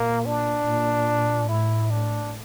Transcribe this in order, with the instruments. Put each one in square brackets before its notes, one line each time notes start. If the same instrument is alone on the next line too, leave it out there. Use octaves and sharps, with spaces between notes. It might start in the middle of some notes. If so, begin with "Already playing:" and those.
Already playing: [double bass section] A#2 [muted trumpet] A#3
[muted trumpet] D4
[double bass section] A#2
[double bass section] A2 [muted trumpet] E4
[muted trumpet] D4